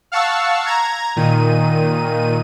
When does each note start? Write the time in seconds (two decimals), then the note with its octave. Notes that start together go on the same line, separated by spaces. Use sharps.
0.12 F5 F#5 A5 C#6 E6
0.66 A#5 G#6
1.16 A#2 D#3 D#7